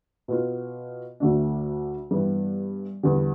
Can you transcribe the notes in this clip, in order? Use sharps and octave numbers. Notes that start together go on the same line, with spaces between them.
B2 B3 F4
D2 D3 A3 D4
G2 E3 B3
E2 D3 G3